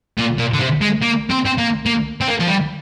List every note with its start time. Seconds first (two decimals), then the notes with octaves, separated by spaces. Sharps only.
0.18 A#2
0.38 A#2
0.53 D3
0.60 C3
0.81 G#3
1.02 A#3
1.30 C4
1.45 C4
1.58 A#3
1.86 A#3
2.21 C4
2.28 A#3
2.40 F3
2.48 G3